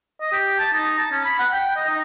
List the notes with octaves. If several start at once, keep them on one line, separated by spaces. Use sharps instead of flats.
D#5
G4
A5
D#4
A5
C#4
B5
F#5
G5
D#5
D#4